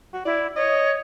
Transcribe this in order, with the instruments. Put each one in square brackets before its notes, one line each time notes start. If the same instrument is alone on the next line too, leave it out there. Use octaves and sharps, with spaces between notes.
[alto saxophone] F#4
[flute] E4 [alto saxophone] D5
[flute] C#5 [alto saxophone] D#5